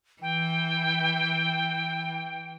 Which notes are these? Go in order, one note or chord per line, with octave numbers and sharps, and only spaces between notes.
E3 G5